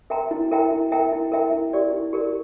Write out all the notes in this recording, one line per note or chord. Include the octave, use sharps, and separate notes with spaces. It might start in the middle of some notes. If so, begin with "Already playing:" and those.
A#4 E5 G5 A#5
E4
A#4 E5 G5 A#5
E4
A#4 E5 G5 A#5
E4
A#4 E5 G5 A#5
E4
G4 A#4 D5
E4
G4 A#4 D5